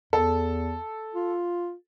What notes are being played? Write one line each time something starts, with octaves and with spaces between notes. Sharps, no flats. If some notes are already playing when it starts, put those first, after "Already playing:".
E2 A4
F4